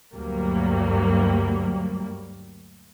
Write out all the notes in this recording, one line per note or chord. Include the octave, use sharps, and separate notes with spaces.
D2 G2 F#3 G3 A#3